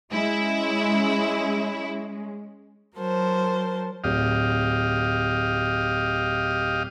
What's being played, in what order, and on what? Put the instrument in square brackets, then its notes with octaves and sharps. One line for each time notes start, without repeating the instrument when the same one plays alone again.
[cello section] G#3 C#4 [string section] E4
[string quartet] F#3 A#4 C5 A5
[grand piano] D1 [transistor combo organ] G4 D#5 F5